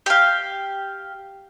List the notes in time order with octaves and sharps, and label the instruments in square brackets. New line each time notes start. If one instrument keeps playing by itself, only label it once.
[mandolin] G4 F5